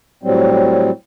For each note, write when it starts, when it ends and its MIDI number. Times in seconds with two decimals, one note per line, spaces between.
0.23 0.91 45
0.23 0.91 54
0.23 0.91 55
0.23 0.91 60